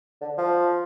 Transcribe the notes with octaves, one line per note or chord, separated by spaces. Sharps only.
D3
F3